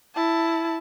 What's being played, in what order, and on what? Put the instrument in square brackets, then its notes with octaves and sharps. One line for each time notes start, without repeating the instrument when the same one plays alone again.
[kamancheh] E4 A5